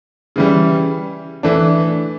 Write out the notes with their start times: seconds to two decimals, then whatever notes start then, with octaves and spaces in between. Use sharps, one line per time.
0.36 C#3 E3 G3
1.43 E3 A3 D4